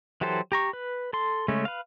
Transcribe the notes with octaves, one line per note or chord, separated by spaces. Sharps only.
E3 F#3 G4 A4 C5
G4 A#5 C#6
B4
A4 C6
C#3 G#3 A3 C#4
B4 F5